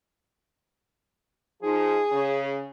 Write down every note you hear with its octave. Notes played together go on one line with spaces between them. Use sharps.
F3 D#4 G#4
C#3